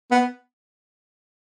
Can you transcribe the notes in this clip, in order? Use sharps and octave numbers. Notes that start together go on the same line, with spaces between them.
B3